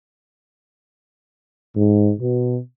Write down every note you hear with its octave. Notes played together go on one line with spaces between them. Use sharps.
G#2
B2